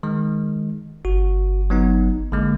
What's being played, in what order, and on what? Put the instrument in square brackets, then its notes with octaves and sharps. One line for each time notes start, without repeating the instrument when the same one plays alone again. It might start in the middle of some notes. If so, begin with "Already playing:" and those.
[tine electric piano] D#3 G#3
[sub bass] G1 [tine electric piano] F#4
[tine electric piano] F#3 B3 D#4
[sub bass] A1 [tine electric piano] D3 G#3 A#3